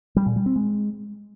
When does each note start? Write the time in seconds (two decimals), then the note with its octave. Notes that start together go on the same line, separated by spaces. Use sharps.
0.16 G3
0.26 A#2
0.36 G3
0.46 C4
0.56 G#3